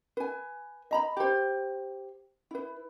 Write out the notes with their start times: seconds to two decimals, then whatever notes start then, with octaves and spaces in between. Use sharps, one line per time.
0.17 B4 G#5
0.91 D#5 A#5 B5
1.17 G4 C5
2.51 E4 B4